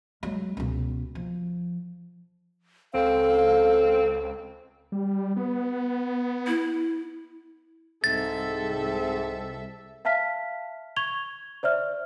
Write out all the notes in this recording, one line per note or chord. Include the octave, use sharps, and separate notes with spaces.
F#3 G#3
C#2 B2
F3
C#2 C4 A4 F5
G3
B3
E4
C2 G#2 C4 A4 E5 A6
E5 F5 A5 F6 B6
C#6 G#6 F7 G7
C5 D5 E5 F6